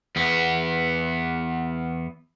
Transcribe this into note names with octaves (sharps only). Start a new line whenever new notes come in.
E2 B3